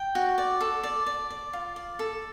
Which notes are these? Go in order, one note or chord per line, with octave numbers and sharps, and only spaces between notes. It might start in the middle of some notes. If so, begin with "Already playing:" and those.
Already playing: G5
F#4
D5
A4
D5
D5
D5
F4
D5
A4